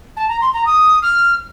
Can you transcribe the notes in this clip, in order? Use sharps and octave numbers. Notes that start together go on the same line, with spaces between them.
A5
A#5
C6
A#5
D#6
F6